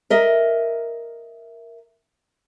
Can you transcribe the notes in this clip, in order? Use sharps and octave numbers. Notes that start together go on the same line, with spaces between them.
A#4 D#5 E5